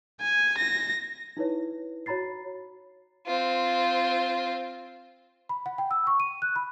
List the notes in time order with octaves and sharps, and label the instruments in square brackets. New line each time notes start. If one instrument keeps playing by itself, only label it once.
[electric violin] G#5
A#6
[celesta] D#4 E4 B4 C#5
F#4 C#5 A#5 B5 A6 C7
[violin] C4 F4
[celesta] B5
F#5
G5
E6
C#6
D#7
F#6
B5